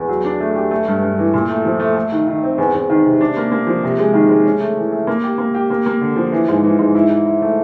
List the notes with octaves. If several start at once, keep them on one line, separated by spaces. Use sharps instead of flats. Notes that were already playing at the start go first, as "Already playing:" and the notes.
Already playing: E2
F#3
D4
A3
G4
A3
G2
G2
E3
A#2
A3
F3
A3
A3
D#3
D#3
C4
E2
E2
D#3
C3
D4
A#3
A#3
F3
C3
G#3
D#3
G#3
C#4
A3
E3
A3
A#3
G4
A#3
G4
A#3
A#3
D3
F3
E3
G#2
E3
G#2
E4
E4
E4
A3